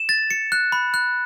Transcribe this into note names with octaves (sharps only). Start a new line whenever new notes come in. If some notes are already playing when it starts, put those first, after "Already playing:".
Already playing: E7
A6
C#7
F#6
B5
F#6